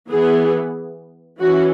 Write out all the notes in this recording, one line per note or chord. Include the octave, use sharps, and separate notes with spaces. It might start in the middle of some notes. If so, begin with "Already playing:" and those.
E3 B3 G#4
E3 C#4 F#4